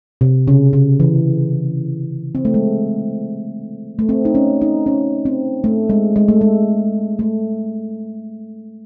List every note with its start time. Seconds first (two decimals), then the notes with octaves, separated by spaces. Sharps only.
0.21 C3
0.48 C#3
0.73 C#3
1.00 E3
2.35 C4
2.45 A3
2.54 G#3
3.99 A3
4.09 C4
4.25 D#4
4.35 C#4
4.61 D#4
4.86 C#4
5.25 C4
5.64 A3
5.89 G#3
6.16 G#3
6.28 A3
6.41 G#3
7.19 A3